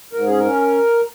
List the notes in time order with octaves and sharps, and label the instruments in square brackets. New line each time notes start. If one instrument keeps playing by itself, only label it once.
[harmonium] G#2 A#4
C#4 G#4
A#4
C#4